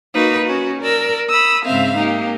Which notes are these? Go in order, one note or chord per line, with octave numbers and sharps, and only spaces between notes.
A#3 D#4 F#4 B4
C#4 F#4
A#4 D5 E6
B5 D#6 E6
G#2 C#3 C4 E5 F5
A#3 D#4 G4